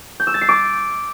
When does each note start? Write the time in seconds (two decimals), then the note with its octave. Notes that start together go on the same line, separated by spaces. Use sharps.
0.20 G6
0.27 E6
0.34 A6
0.41 C7
0.49 D6